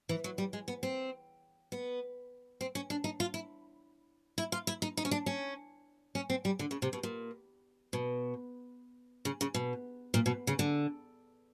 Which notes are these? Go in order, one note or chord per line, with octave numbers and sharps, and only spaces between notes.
E3
F#3
G3
G#3
B3
C4
B3
C4
C#4
D4
D#4
F4
E4
E4
F4
E4
D#4
D#4
C#4
D4
C#4
C#4
C4
G3
D3
C#3
C3
B2
A#2
B2
C#3
C#3
B2
A#2
B2
C#3
D3